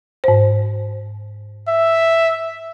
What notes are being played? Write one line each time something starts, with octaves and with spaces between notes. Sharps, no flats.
G#2 C5
E5